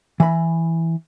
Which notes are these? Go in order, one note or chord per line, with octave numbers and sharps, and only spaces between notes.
E3 B5